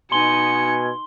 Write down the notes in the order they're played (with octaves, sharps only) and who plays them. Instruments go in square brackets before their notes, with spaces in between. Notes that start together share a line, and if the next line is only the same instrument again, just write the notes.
[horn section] B2 [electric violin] D#4 C#7 [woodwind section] G#5 [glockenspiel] C6 G7